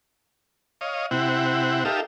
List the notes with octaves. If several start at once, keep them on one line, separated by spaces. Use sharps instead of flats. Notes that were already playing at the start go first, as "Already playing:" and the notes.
C#5 D#5 F5
C3 C4 E4 F#5
D#4 G4 A4 A#4 E5 F5